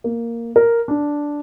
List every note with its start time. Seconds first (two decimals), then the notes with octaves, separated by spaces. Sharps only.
0.04 A#3
0.56 A#4
0.88 D4